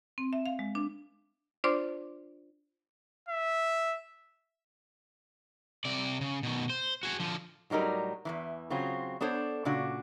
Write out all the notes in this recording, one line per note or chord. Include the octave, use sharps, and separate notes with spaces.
C4
E5
F5
G#3
D4
D4 F4 C5 D5 C6 D6
E5
C3 D5
C#3
B2 D#3
C5
F#4 G#4
D3 F3
A2 F#3 G3 D#4 A#4
E2 G2 E3
C#3 F#3 C4 F4
B3 D4 A4 C5 C#5
A#2 C#3 D4 F#4